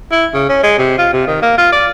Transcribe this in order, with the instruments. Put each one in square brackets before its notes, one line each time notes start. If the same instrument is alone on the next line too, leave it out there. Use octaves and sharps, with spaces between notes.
[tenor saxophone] E4
C#3
C#4
G#3
C3
F4
C3
D#3
A#3
F4
D5